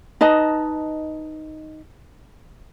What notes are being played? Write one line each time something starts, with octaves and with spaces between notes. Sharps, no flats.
D#4 B4 D#5 A5